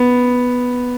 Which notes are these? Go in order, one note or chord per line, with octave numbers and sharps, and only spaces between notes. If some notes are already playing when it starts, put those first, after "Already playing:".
Already playing: B3